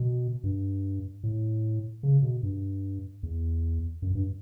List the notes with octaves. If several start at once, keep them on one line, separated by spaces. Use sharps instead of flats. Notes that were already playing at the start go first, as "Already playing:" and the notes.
Already playing: B2
G2
A2
C#3
B2
G2
E2
F#2
G2